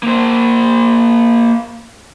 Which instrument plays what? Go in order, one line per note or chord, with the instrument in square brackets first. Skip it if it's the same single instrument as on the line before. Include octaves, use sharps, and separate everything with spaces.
[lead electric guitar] A#3 C5